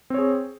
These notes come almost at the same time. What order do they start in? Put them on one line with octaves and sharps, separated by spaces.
C4 C#5 G#4